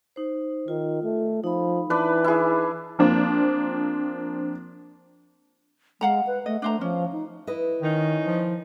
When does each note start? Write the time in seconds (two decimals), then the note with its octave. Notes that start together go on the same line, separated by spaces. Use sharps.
0.16 D#4 C5
0.68 D#3 F4
1.03 A3
1.44 F3 D#4 B5
1.90 E3 D4 B4
2.24 E4 G#4
2.99 F3 A#3 C4 D4
6.01 G#3 F5 F#5 A#5
6.27 B4
6.46 A3 D#5
6.62 A3 D4 C5 A#5
6.81 F3 C#4
7.12 D#4
7.47 E4 B4 D#5
7.82 D#3 C#4 D#4
8.26 F3